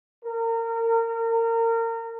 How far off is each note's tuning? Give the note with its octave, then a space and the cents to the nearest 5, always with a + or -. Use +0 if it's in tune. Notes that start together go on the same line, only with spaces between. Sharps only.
A#4 -30